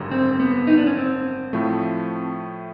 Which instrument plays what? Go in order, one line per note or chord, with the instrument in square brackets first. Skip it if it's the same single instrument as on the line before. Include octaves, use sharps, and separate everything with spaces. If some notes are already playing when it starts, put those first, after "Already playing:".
Already playing: [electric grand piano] G#1 F#2 D3 G3
[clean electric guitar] C4
B3
D#4
D4
C#4
C4
[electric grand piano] A2 F3 A3